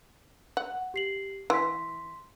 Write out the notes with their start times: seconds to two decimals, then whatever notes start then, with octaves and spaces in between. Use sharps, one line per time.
0.57 F#5
0.94 G4 C7 F#7
1.50 E3 C6 B6